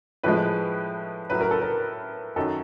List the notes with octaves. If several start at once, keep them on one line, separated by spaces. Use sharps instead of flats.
A2 F3 G#3 B4
A2 F#3 B4
A#4
A4
A#4
F#2 D#3 F#3 A4